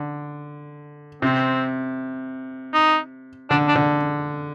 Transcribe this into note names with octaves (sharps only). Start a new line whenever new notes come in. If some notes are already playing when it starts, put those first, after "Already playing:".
Already playing: D3
C3 C4
D#4
D3 D4
D4
D3